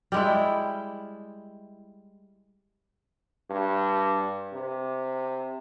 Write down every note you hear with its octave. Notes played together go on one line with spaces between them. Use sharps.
G3 G#3 E4
G2
C3